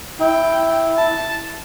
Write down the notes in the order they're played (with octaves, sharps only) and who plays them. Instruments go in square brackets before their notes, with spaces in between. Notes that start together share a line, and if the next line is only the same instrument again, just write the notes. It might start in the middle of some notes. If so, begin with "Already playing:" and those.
[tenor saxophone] E4 [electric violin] G5
[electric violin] A5